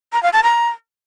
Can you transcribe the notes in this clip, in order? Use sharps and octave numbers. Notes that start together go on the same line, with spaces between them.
A#5
F5
A5
A#5